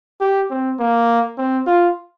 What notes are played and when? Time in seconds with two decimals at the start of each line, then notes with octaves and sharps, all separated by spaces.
0.21 G4
0.51 C4
0.79 A#3
1.38 C4
1.67 F4